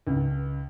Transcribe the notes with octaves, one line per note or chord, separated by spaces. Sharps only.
C#2